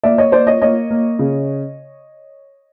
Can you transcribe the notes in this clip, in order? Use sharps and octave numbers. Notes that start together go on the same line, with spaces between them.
A#3 D5 E5
C#5 D#5
A#3 C5 D5
C#5 D#5
A#3 C#5 D#5
A#3
C#3